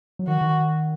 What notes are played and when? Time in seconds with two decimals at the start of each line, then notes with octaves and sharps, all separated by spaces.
0.19 F#3
0.27 D#3 F#4
0.41 D#3